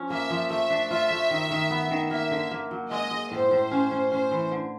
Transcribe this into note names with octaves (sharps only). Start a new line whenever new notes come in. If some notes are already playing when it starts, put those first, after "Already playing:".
Already playing: F3 C#4
A#3 E5
F3
A3 E5
D4
F4 E5
A3
D#3
D#3
B3
D#3
A#3 E5
D3
A#3
F#3
G#3 D#5
G#3
A2 C5
A2
C#4
C#4
C#4 C5
E3
D3